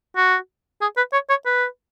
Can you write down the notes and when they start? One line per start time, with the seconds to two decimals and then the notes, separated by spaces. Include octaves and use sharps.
0.16 F#4
0.81 G#4
0.97 B4
1.13 C#5
1.29 C#5
1.46 B4